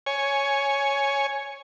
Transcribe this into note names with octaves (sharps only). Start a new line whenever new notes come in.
C#5 G#5